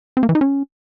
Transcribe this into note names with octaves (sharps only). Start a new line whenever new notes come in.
C4
A#3
E3
D#4
C#4